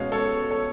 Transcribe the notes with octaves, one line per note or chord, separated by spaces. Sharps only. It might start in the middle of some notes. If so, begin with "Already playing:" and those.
Already playing: B2 G#3 C#4 C#5 F5
A4 C#5
A4 C#5